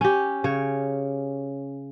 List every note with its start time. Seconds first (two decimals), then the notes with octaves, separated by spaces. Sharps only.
0.01 C#4 G4
0.44 C#3 C#5